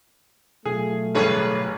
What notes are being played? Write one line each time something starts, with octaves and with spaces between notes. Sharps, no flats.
B2 F#3 A3 F4 G#4
A1 G2 D3 G#4 B4 C#5